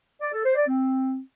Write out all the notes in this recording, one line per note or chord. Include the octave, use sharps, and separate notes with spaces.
D5
A4
C5
D5
C4